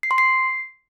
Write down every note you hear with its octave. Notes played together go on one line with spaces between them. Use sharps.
C7
C6
C7